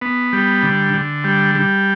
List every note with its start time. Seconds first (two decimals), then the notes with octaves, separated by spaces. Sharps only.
0.01 B3
0.33 G3
0.63 D3
0.94 D3
1.24 G3
1.55 G3